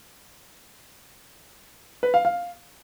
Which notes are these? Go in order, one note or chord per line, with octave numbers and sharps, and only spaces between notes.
B4
F5
F5